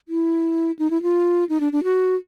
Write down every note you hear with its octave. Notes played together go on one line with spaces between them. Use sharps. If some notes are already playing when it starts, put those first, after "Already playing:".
E4
D#4
E4
F4
D#4
D4
D4
F#4